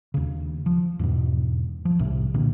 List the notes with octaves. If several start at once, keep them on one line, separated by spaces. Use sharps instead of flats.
D#2 C#3
F3
E2 G#2 B2
F3
C2 A2 C3
A#2 D3